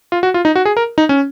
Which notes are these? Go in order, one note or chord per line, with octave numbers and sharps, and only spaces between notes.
F4
F#4
F4
D#4
F#4
G#4
A#4
D#4
C#4